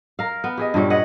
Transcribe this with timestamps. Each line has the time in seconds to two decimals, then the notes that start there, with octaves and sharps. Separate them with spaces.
0.19 A#4 F5
0.44 B3
0.58 G4 G#4 D#5
0.74 G2 A#2 G3 C#5
0.90 B4 C#5 D#5 F#5